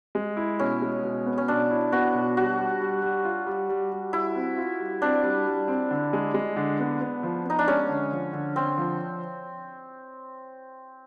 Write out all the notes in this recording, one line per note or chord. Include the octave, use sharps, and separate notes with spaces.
G#3
E4
B2 C#4
G#3
B2
B3
C#4
B2 D4
E4
B3 F#4
B2
G3 F#4
G3
G3
G3
F4
G3
G3
G3
G3 E4
C4
F4
G3
C4 D4
G3
G3
C4
D3
G#3
G#3
D3
B3
B3
F3
B3 D#4
D4
G#3 C#4
D3
F3
D3
D3 C4
F3